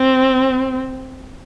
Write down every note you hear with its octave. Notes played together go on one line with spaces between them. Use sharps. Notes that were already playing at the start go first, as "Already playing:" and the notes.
Already playing: C4